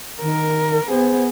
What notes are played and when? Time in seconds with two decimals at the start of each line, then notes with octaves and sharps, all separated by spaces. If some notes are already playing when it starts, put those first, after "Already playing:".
0.22 D#3 A#4
0.89 B3 G#4 C5